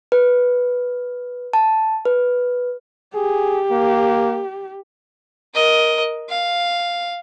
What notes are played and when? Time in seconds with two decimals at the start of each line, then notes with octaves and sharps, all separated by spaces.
0.12 B4
1.53 A5
2.05 B4
3.15 G4 G#4
3.71 A#3
5.54 A#4 D#5
6.29 F5